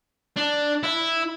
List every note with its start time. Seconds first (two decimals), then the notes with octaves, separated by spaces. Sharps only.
0.36 D4
0.83 E4